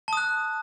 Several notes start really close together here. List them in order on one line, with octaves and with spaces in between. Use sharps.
A5 D#6 F#6